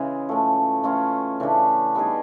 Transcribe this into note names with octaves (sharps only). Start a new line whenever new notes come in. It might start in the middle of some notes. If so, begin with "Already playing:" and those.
Already playing: C#3 E3 G#3
A2 F3 A3
E3 A3 C#4 F4
C#3 E3 A3 D4
G3 B3 D#4 G#4